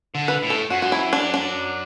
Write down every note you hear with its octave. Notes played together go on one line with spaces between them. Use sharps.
D3
B4
A2
A4
F#2 F#4
F#4
E4
D4
D4